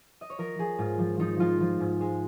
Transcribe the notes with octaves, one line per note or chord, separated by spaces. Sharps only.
D#5
C#5
F3 A#4
F3 G#4
G#2 F4
F3
F3 D#4
F3 F4
F3
G#2
G#3